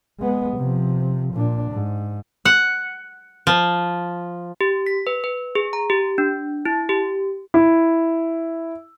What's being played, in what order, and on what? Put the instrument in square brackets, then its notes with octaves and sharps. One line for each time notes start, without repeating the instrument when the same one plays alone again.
[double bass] G#3 B3
C3 F3
A#2 D4
G#2
[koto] F#5
F3
[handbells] G4
B6
B4
B4
G#4
A#5
G4
D4
E4
G4
[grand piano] E4